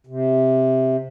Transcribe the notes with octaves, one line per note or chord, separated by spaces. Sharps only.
C3